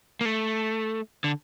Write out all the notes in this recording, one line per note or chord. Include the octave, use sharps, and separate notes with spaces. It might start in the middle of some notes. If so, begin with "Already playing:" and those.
A#3
A3
D3